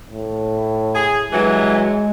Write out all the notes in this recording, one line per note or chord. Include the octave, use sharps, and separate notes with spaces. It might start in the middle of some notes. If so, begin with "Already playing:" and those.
A2
G#4
G2 E3 F#3 G#3